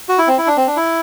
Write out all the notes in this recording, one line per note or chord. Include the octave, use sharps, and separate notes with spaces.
F#4
E4
C4
E4
D4
C4
D4
E4